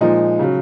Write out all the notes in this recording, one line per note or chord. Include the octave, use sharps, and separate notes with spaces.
A#2 F3 G#3 D#4
C#3 F#3